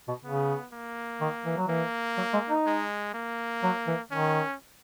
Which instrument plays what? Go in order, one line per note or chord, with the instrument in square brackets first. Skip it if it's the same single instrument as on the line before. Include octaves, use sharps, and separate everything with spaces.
[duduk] B2
[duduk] C#3 [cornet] B3
[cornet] A#3
[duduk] D#3
E3
F#3
[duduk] E3 [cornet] A#3
[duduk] F#3
G#3
D#4
[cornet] G#3
A#3
[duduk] F#3
E3
[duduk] D#3 [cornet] C#4